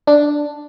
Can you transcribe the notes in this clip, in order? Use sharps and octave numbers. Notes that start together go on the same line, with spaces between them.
D4